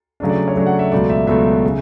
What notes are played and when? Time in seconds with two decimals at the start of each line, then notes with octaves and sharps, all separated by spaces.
0.20 C#3 F#3 A3 D4
0.29 D5
0.48 C#5
0.56 C#3 F#3 A3 D4
0.66 F#5
0.79 E5
0.92 C#2 B2 F#3 A3 D5
1.10 E5
1.27 C#2 B2 F#3 A3 E5
1.65 C#3